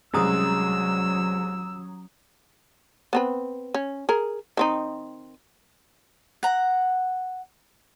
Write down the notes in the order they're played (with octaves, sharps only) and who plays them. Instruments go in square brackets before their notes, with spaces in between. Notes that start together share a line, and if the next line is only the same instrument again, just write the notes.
[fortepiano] C2 G#3 [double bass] F#3 [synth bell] C#4 A#5 D#6 [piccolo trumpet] E6
[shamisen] B3 C4 B4
C#4
G#4 A#4
D#3 C4 D#4
[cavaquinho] F#5 A#5